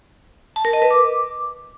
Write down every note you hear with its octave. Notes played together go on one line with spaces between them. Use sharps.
A5
A#4
D#5
B4
D6